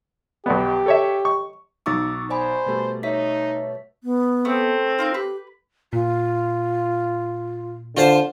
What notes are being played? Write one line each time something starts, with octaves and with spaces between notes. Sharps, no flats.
B1 G3 B3 G4
A4 C#5 E5
C#6
B1 D#4 C#6 D6 E6 A6
C5 D5 G#5 B5
B2 G3 A3
D#4 C#5 E5 B6
B3
A3 C4
D#4 F4 A#4 G6
G4 B4
A#2 F4
D3 F4 C5 A5